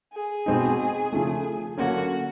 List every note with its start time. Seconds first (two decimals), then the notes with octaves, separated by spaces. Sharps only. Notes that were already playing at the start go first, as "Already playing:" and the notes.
0.13 G#4
0.46 B2 G#3 C4 D#4
1.13 C#3 F3 A3
1.78 D3 F#3 A#3 C#4 F#4